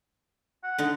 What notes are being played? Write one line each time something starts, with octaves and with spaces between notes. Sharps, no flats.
F#5
D3 D#4